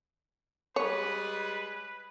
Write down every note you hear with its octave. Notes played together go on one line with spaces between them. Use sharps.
G3 G#3 B4 C#5